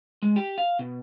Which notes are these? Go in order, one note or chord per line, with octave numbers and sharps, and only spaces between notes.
G#3
G4
F5
B2